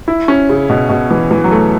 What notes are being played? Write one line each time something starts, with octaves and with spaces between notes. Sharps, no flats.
E4
C#4
C#3
B2
B2
E3
E3
F#3
A3